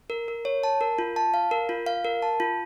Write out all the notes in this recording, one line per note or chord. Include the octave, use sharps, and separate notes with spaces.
A#4
A#4
C#5
A5
A#4
F4
A5
F5
A#4
F4
F5
A#4
A5
F4